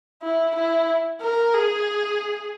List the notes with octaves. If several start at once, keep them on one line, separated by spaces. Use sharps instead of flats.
E4
E4
A#4
G#4